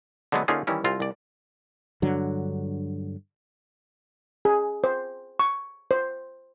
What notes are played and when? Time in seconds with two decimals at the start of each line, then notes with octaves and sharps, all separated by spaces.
0.32 D3 F#3 G#3 A3 B3
0.48 D3 A#3 C#4 D#4 F4 G#4
0.67 D#3 E3 G3 C#4 E4
0.84 C2 C4 F4
1.00 C2 D5
2.02 G2 D3 F#3
4.45 G#4
4.84 C5
5.39 C#6
5.91 C5